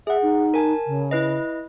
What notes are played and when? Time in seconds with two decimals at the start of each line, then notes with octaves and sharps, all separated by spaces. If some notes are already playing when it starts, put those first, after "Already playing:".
0.07 G#4 E5 F#5
0.22 D#4
0.54 A#4 G#5 A5
0.87 C#3
1.11 E4 B4 D#5